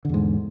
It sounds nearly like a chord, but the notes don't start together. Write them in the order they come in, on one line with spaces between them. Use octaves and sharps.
D3 E2 G#2